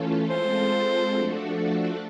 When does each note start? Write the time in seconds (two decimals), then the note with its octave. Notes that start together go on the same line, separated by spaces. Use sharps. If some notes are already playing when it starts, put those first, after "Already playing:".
Already playing: E3 A3 C#4 F4 A4
0.30 G#3 C4 F4 A4 C5
1.14 F3 A3 D4 F#4 A4